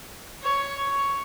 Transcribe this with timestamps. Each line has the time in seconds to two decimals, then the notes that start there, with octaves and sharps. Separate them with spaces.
0.43 C#5